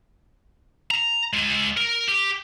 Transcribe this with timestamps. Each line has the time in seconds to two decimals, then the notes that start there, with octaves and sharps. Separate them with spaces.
0.91 A#5
1.33 G#3 F4
1.77 A#4
2.08 G4